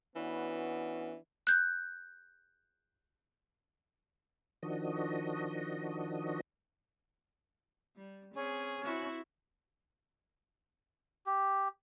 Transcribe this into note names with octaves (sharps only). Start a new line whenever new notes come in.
E3 B3 C#4 D4 F#4
F#6 G6
D#3 F3 D4 F#4 D#5
G3
C4 C#4 G#4
C4 E4 F#4
G4